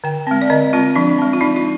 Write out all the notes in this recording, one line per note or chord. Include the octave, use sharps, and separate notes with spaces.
D3 G5
G#3 C4
D5
D3 D#5
G#3 C4 F4
F3 D4
G#3 C4
F4
F3 D#4
F4